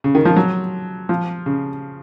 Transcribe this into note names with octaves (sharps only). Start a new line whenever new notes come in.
C#3
D#3
F3
F#3
F3
C#3